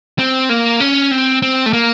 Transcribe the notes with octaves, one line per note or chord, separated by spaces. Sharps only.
C4
A#3
C#4
C4
C4
A3
A#3